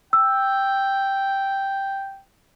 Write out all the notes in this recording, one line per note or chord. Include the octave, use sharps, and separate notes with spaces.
G5 E6